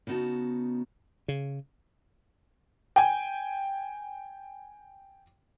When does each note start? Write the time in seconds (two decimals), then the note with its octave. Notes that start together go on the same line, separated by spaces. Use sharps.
0.07 C#3 B3 D#4 F#4 A5
1.28 C#3
2.96 G5 G#5